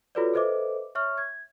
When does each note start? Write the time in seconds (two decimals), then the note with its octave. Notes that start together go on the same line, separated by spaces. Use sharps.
0.15 F4 F#4 A4 B4 C#5 D5
0.33 A4 B4 C5 D#5 E5 D6
0.95 C#5 E5 C#6 F6
1.18 G#6